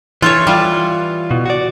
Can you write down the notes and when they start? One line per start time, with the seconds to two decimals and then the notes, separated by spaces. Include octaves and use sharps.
0.22 E3 F4 A4 C#5
0.47 E3 G3 F4
1.31 B2
1.46 F#4 D5